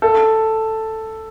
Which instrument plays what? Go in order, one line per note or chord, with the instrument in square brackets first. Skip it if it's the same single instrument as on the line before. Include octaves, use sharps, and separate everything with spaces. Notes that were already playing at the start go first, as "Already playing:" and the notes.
[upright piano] A4